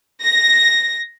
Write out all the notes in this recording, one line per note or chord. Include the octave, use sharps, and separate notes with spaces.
A#6